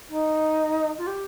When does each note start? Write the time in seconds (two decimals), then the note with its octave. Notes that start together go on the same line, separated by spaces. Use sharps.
0.09 D#4
0.98 F4
1.07 G4